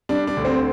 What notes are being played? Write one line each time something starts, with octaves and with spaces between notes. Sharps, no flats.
G3 D4
D4
D2
C4